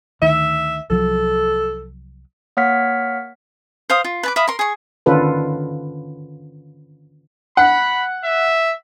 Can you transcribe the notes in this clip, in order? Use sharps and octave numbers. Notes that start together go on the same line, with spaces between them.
D2 D#3 E5
C2 F3 F#3 A4
A#3 C#5 F#5 F6 B6
C5 F5 D#6
F4
B4 A5 D6
E5 F5 B5 D#6
A#4 C6
G#4 C#6
D3 D#3 C#4 F4 A4 B4
F#5 B5
E5